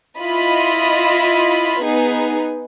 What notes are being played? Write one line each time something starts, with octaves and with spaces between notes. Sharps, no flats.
E4 F4 D#5 B5
B3 D#4 G#4 B4